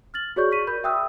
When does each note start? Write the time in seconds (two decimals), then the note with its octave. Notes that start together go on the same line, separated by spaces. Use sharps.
0.14 F6 A6 F#7
0.36 F#4 G#4 C#5 D5 C#6 G6
0.51 C#6 B6 D#7
0.67 A#4 B5 G6
0.84 E5 G5 D#6 E6 F#6